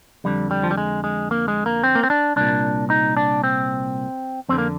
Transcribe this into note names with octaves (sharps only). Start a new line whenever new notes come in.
F2 D3 G3
G3
F3
G3
G#3
G#3
A#3
G#3
A#3
C4
A#3
C4
D4
C2 A#2 D4
D#4
D4
C4
F2 D3 C4
A#3